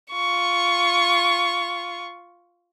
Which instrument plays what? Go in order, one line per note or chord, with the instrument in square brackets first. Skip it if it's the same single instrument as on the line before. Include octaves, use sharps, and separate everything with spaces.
[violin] F4 C#6